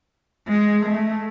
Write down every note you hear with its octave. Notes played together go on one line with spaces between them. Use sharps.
G#3
A3